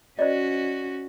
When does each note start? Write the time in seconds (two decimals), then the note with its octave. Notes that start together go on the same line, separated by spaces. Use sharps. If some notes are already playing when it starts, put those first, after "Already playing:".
0.19 C#4 F#4 C5 D5 D#5